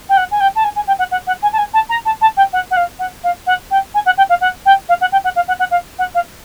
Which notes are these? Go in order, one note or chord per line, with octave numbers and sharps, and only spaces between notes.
G5
F#5
G#5
G5
A5
G#5
G#5
G5
F#5
F#5
F#5
G#5
A5
G#5
A5
A#5
A5
A5
G5
F#5
F#5
F5
F#5
F5
F#5
G5
G#5
F#5
G5
F5
F#5
G5
F5
F#5
G5
F#5
F5
F#5
F#5
F5
F#5
F5